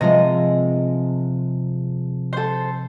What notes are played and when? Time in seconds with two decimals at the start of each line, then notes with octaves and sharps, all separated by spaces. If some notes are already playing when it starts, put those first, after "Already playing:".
0.01 C3 F3 G#3 D#5
2.33 A4 C5